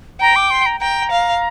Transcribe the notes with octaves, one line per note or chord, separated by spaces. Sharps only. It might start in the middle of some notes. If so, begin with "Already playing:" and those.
G5 A#5
D6
C6
A#5
G5 A#5
F5